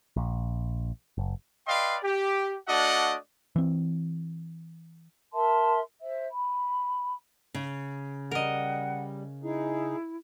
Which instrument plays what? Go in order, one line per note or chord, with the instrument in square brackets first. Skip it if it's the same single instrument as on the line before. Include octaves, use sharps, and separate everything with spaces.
[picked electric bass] A#1
F#1
[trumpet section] B4 D5 D#5 F5 G5 C6
G4
A3 D4 F#4 D5 D#5 F#5
[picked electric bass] E3 C4
[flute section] A#4 E5 A5 C6
C5 E5
B5
[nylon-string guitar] C#3
[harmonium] G3 [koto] A#4 D#5 [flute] F#5
[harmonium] D#4 G#4 [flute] E4